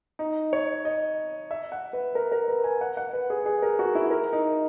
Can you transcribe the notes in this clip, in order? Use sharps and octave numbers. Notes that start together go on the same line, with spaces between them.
D#4
C#5
D#5
E5
F#5
B4
A#4
A#4
B4
G#5
F#5
F#5
B4
G#4
G#4
A#4
F#4
E4
A#4
D#4